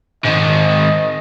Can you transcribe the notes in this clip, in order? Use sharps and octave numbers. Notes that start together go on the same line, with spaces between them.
G#2 D#3 D#5